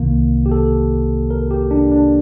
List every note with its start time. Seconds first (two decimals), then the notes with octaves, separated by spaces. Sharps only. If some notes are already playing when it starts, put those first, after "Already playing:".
Already playing: C2 C3 D#3 A#3
0.46 G4
0.52 A4
1.30 A#4
1.51 G4
1.71 D4
1.91 D4